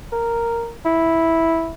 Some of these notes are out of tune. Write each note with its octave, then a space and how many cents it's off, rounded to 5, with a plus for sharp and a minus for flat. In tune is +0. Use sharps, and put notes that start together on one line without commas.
A#4 -5
E4 -5